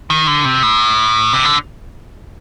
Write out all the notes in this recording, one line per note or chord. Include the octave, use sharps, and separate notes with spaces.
D#3
D3
C3
A2
C3
D3